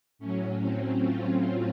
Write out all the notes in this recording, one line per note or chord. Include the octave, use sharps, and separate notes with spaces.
A2 F#3 C#4
C4
F4